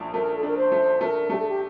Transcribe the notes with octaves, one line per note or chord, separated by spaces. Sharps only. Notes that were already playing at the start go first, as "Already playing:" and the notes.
Already playing: A#1 A3 D4
A3 A#4
A4
D4 A#4
C5
A3
A3 A#4 C5
A3 G4
A4
G4